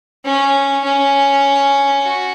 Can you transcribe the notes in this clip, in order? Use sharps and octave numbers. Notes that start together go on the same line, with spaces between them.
C#4
C#4
F#4